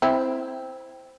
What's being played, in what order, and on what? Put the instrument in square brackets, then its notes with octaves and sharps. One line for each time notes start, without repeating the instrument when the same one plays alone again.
[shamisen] C4 E4